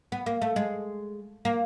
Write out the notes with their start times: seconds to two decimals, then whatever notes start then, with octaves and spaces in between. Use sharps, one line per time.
0.12 B3
0.26 A#3
0.42 A3
0.56 G#3
1.45 A#3